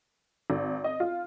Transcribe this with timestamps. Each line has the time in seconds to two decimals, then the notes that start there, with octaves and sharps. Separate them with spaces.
0.50 G#1
0.84 D#5
1.00 F4